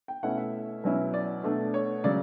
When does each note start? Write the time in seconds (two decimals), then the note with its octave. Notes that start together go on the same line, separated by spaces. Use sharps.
0.08 G5
0.23 B2 A3 C#4 E4 F#5
0.38 E5
0.84 B2 F#3 C#4 E4
1.14 D5
1.44 B2 A3 D4
1.74 C#5
2.04 C#3 F#3 D5